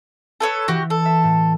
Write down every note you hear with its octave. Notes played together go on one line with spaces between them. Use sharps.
A4 B4 C#5
E3 F#4 G4
A4
E5
A2